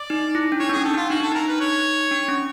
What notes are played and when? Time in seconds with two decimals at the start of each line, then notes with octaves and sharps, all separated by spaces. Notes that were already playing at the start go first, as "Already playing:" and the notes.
Already playing: D5
0.10 D#4
0.35 E4
0.52 D4
0.60 D#4 C#5
0.69 D4
0.73 C#4 G#4
0.85 A4
0.94 D4 F4
1.10 D#4 F#4
1.21 D4 A4
1.32 D#4 A#4
1.48 B4
1.60 C#5
2.11 D4
2.28 C#4